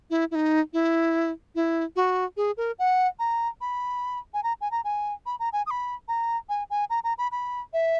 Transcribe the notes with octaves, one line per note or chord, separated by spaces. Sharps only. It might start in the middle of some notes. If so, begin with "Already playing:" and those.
E4
E4
D#4
E4
E4
F#4
G#4
A#4
F#5
A#5
B5
G#5
A#5
G#5
A#5
G#5
B5
A#5
G#5
D#6
B5
A#5
G#5
G#5
A#5
A#5
B5
B5
E5